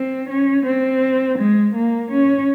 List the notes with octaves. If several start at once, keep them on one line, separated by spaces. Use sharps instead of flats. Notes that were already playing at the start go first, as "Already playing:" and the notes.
Already playing: C4
C#4
C4
G#3
A#3
C#4